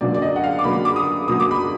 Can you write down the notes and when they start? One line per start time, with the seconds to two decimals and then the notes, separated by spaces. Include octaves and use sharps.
0.01 F#2 D3 F#3 A#3 D5
0.14 D5
0.22 D#5
0.36 F#5
0.44 F5
0.59 D6
0.64 F#2 D3 F#3 A#3 B5
0.85 D6
0.96 D#6
1.28 F#2 D3 F#3 A#3 D#6
1.40 D6
1.51 B5